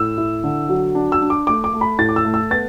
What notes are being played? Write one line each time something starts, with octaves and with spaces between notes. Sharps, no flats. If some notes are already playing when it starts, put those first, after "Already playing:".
Already playing: A2 E6
E4
D3
F#3
D4
E6
D4
D6
A3 D6
D6
A3
B5
A2 A6
D6
E6
A3
E6
B3 A6